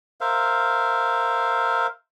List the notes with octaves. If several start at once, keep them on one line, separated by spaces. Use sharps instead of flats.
A#4 C5 E5 F5